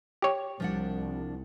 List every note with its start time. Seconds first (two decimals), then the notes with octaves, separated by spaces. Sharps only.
0.22 G4 C#5
0.60 C2 F3 D4 F#5